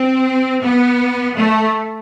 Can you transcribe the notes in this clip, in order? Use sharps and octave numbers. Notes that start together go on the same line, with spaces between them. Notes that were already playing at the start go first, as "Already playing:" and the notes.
Already playing: C4
B3
A3